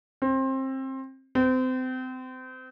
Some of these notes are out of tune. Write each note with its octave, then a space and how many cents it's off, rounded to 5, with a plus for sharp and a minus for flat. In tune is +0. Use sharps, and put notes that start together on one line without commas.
C4 +25
C4 -30